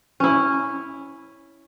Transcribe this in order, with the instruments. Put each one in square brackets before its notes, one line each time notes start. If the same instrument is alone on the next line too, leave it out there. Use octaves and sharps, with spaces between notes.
[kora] C#4 E4